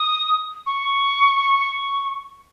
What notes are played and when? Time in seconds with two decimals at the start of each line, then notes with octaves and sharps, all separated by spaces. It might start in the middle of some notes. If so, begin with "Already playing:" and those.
Already playing: D#6
0.66 C#6